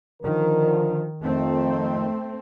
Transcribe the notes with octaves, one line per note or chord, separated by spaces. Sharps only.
D3 D#3 F3 A#4
F2 D#3 A3 C4